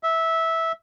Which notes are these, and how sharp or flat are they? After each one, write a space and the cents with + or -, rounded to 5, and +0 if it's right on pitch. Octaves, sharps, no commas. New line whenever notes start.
E5 -10